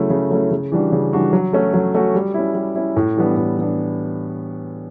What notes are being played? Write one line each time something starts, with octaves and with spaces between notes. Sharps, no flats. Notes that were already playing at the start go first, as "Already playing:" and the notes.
Already playing: C#3 F#3 A3 C#4 E4
C#3
F#3 A3 C#4 E4
C#3
E3 G3 D4 F#4
C#3
E3 G3 D4 F#4
F#3
A3 C#4 F#4
F#3
A3 C#4 F#4
G3
C#4 E4
G3
C#4 E4
A2
E3 G3 B3 D4
A2
E3 G3 B3 D4